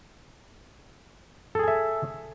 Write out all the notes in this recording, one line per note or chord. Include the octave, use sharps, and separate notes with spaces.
G#4 A4 E5 G#5